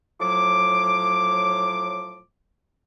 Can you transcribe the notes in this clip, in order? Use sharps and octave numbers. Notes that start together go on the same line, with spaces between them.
A2 F3 F#3 D6